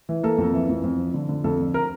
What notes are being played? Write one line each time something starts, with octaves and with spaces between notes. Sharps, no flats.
E3
A#3 A4
F2
E3
F2
F2
F3
D3
D3
F2 A4
D3
A#4